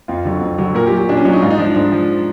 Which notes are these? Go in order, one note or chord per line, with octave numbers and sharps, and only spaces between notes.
F2 F4
D3 F#3
F2
D3 F#3
A#2 A#4
G4
F#3
G4
A#2 D4
C#4
F#3 D4
D#4
G#2 F4
D#4
F3 D4
D#4
G#2 D4
F3